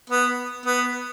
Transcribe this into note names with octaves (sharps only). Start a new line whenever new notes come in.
B3
B3